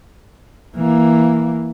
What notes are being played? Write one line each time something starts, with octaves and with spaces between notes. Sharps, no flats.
E3 A#3